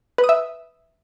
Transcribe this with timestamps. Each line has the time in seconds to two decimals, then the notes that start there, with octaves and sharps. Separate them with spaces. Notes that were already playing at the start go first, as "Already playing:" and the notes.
0.18 B4
0.24 D#6
0.29 E5